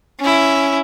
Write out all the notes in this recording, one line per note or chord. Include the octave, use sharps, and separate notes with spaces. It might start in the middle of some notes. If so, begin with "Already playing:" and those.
C#4 E4